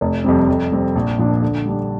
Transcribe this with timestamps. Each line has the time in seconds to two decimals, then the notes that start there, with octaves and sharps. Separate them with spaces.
0.01 F1
0.24 F2 C3 G3 C4
0.48 F2
0.72 C3 G3 C4
0.95 A#1
1.19 A#2 F3 D4
1.42 D3
1.66 G3 D4